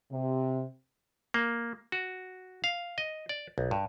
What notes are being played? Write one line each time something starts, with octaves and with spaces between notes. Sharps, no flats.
C3
A#3
F#4
F5
D#5
D5
B1
G2